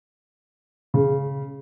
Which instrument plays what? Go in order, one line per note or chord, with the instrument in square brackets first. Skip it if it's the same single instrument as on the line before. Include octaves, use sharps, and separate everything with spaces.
[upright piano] C#3